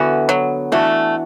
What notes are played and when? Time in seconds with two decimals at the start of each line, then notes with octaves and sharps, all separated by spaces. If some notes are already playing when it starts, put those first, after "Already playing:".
Already playing: D3 E3 B3 F#4
0.29 F#3
0.72 E3 A3 D4 F#4